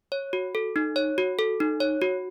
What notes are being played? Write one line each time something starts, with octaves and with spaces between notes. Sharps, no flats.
C#5
F#4
A4
D#4
C#5
F#4
A4
D#4
C#5
F#4